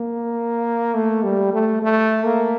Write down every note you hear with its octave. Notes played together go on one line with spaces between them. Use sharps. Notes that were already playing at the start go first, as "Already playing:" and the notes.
Already playing: A#3
A3
G3
A3
A3
A#3